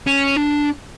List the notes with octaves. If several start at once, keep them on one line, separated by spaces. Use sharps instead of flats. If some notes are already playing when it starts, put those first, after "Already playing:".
C#4
D4